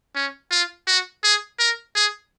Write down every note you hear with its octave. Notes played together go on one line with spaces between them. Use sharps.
C#4
F4
F#4
G#4
A#4
G#4